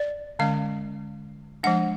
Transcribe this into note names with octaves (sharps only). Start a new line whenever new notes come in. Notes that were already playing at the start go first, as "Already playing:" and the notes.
Already playing: D5
D3 G#3 C#4 F5
F3 G#3 D4 F#5